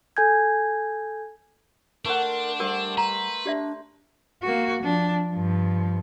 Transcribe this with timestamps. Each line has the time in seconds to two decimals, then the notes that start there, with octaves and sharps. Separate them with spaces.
0.17 A4 G#5 G6 G#6
2.05 A3 D4 A#4 C5 F#5
2.60 G3 A#4 C5 F#5
2.98 B4 A#5
3.46 D4 G4 D5 E5
4.42 A#3 F#4
4.82 F3 D4
5.30 G2 F3